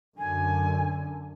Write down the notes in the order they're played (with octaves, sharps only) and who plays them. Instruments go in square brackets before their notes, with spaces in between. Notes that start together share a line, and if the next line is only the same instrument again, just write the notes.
[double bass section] F#2 D3 [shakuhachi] G#5